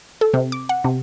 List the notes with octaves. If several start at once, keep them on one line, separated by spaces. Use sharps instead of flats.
A4
C3
D6
F#5
C3